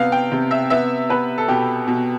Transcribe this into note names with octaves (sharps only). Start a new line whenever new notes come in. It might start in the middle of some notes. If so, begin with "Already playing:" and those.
Already playing: C3 B3 F5
G5
C3
E5
B3 E5
B3 B4
A4
B2 G4
B2